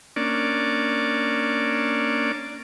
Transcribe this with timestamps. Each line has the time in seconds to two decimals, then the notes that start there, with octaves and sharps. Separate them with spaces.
0.16 A#3 C#4 D4 D5